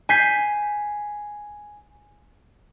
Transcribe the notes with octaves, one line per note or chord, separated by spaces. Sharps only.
G#5 G6 B6 C7